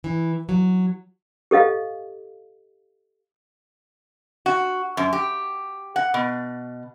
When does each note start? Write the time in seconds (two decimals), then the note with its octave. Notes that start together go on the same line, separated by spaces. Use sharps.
0.04 E3
0.49 F#3
1.51 G4 A4 D#5 F5
4.46 F#4
4.97 F#2
5.13 G4
5.96 F#5
6.14 B2